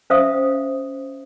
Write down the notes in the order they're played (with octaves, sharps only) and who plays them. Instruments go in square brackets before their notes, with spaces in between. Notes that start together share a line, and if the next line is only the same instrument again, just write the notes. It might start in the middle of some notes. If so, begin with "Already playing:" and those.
[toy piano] C#4 C5 E5 F5 D#6